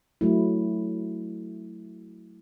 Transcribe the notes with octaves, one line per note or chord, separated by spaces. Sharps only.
F#3 A3 E4